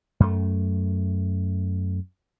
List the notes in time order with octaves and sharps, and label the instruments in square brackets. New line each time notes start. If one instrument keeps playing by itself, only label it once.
[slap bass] F#2 A3